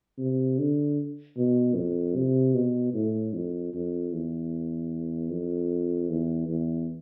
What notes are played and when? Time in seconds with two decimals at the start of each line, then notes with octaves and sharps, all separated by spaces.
0.18 C3
0.59 D3
1.37 B2
1.76 F2
2.16 C3
2.54 B2
2.94 A2
3.34 F2
3.74 F2
4.13 E2
5.30 F2
6.10 E2
6.49 E2